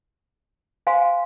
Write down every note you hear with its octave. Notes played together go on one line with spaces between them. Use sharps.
C5 F5 G#5 C6